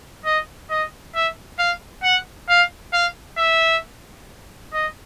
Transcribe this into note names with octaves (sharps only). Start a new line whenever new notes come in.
D#5
D#5
E5
F5
F#5
F5
F5
E5
D#5